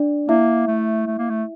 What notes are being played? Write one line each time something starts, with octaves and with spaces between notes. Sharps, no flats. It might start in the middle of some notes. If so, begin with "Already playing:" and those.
Already playing: D4 D5
A#3 E4 E5
A3
A3
A#3
A3